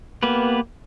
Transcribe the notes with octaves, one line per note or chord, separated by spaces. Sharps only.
A#3 B3 G4 B4